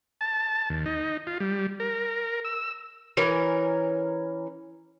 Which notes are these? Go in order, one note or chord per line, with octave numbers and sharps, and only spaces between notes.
A5
D#2
D#4
F4
G3
A#4
E6
E3 C#4 A#4